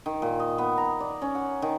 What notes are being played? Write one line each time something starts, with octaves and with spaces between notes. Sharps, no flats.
D#3
A#2
D#5
B3
A#5
D5
C#4
F#5
D#3